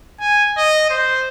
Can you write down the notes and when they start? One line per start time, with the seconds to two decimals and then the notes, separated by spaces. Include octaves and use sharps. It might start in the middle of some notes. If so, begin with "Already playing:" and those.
0.20 G#5
0.57 D#5
0.90 C5